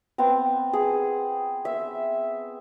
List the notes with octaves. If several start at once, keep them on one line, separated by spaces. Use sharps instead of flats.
B3 C4
G#4
E5